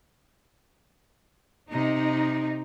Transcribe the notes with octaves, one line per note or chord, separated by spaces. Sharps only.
C3 D#4